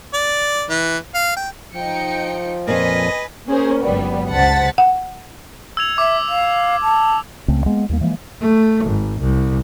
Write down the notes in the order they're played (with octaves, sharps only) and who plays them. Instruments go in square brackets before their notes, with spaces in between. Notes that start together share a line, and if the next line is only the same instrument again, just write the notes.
[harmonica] D5
E3
F5
G5
[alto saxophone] F3 [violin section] D#4 G5 C#7
[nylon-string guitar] F2 A#2 [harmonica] B4 D#5 [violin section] G#5
[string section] A#3 C#4 G#4 A#4 C5
G1 C#2 F#3 G3 B3
C#2 C5 F#5 A5 A6 B6
[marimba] F#5
[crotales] E6 G#6 F7
[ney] E5 [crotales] D6
[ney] F5
A5
[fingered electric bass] C#2 C#3 A3 C4
G#3 A#3 B3
D#2 G3 A#3
E3 F3 G#3 A#3
[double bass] A3
G#1
C2